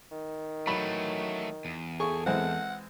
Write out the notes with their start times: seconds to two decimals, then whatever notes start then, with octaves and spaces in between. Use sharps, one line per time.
0.11 D#3
0.67 E3 F#3 A3 B5
1.65 E2
2.00 G#4 A4 C#6
2.26 E3 G#3 C4 F#5